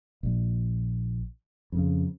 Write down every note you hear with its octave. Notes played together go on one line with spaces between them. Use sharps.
A#1
F2 C#3